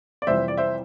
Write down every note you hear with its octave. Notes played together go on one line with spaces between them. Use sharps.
D5
F1 F2 E3 G3 C5 E5
D5
C5 E5